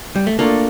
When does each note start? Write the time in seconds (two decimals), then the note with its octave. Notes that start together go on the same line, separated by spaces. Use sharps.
0.16 G3
0.27 A3
0.39 A3 A#3 D4 F4 A4